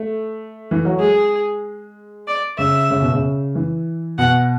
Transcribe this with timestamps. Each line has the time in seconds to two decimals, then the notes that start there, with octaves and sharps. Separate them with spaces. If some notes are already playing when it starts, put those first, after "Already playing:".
Already playing: A3
0.71 E3
0.85 F#3
0.99 G#3 G#4
2.28 D5
2.58 C#3 E5
2.91 C#3
3.02 B2
3.13 C#3
3.55 E3
4.18 B2 F#5